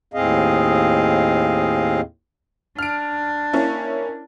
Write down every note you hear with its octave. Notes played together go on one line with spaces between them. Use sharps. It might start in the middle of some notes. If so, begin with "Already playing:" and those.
D#2 A2 C4 G#4 D#5 F5
D4 F6 D7
A#3 C#4 E4